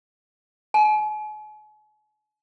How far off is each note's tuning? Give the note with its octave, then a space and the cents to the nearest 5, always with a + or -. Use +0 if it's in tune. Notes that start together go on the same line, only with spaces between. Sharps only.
G#5 +45